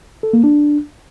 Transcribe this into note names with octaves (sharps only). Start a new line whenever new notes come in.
A4
A#3
D4